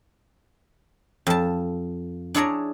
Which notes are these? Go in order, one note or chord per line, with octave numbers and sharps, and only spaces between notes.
F2 A5
D4 E4 G#4 C#5 D5 A#5